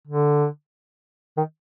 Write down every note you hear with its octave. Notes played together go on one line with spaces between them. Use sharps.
D3
D#3